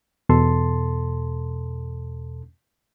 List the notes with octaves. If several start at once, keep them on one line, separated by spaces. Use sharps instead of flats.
E2 B2 A4 A5 C6